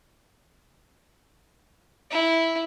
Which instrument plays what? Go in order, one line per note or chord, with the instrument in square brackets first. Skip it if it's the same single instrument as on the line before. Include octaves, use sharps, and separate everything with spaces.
[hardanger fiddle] E4